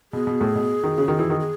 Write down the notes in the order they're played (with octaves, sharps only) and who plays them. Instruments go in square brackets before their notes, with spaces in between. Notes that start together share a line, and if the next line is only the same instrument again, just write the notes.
[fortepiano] B2 [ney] G#4
[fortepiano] B2
A2
B2
D#3
C#3
D#3
E3
D#3
[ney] G#4